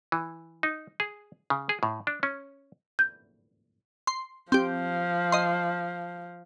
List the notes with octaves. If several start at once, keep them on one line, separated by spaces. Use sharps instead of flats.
E3
D#4
G#4
C#3
G#4
A2
D4
C#4
G6
C6
F3 C4 G4
D#5 C6